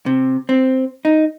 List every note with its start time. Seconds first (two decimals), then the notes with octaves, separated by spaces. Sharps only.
0.06 C3
0.49 C4
1.05 D#4